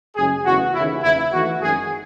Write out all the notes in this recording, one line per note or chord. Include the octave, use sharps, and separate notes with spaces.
F#1 F#2 C#3 G#3 G#4
F#1 E2 C#3 E3 A3 F#4
D#2 C#3 E3 E4
F#1 E2 C#3 E4
E2 D#3 A3 F#4
G#1 F#2 D#3 G#4